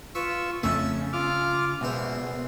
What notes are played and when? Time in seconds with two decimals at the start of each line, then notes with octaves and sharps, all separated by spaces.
0.15 F4 B4 C#6 E6
0.63 F2 C#3 A3 C#4 E5 A5
1.13 F4 D6 F6
1.81 A#1 B2 E3 G#3 C5